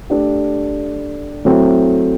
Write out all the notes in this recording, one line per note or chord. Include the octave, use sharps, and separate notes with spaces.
A3 D4 G4
F#3 A3 C4 E4